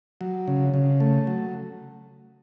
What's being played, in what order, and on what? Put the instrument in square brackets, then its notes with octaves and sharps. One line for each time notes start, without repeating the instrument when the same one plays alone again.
[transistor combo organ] F#3
C#3
C#3
A3
F#3